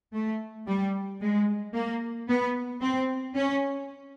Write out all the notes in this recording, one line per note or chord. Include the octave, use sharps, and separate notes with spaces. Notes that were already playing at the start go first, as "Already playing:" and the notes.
A3
G3
G#3
A#3
B3
C4
C#4